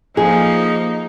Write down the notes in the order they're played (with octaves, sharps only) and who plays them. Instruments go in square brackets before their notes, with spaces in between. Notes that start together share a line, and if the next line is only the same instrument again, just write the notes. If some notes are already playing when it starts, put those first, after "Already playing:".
[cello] F3 A#3 [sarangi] D#4 [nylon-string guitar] G#4